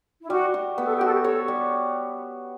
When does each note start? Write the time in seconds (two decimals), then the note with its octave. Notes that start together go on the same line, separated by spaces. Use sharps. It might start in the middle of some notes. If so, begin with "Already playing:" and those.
0.22 E4
0.30 G3 F#4
0.54 F#4
0.77 B3 G4
0.86 A4
0.95 G4
1.01 F#4 A4
1.13 G4
1.24 A4 C#5
1.48 G3